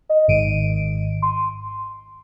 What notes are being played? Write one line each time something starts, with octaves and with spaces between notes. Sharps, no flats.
D#5
G#1 G#2 D#3 D7 D#7
C6